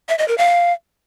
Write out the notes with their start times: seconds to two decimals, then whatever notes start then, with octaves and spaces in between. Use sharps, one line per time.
0.09 E5
0.18 D#5
0.28 A#4
0.38 F5